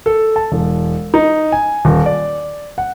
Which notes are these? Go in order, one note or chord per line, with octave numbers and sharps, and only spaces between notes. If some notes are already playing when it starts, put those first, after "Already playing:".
A4
A5
E1
D#4
G#5
D#1
D5
F#5